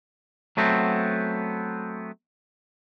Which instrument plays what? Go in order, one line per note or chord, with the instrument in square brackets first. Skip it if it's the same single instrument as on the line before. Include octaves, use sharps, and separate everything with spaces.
[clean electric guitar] F#3 A3 B3 C4